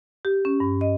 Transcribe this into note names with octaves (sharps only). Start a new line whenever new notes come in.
G4
C#4
G2
D#5